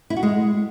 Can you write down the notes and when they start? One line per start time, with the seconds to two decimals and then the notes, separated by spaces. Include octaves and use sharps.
0.10 E4
0.16 F#4
0.23 G#3